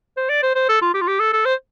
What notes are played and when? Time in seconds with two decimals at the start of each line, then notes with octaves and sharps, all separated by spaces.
0.17 C5
0.29 D5
0.43 C5
0.55 C5
0.69 A4
0.82 F4
0.94 G4
1.01 F4
1.07 G4
1.20 A4
1.33 A4
1.45 C5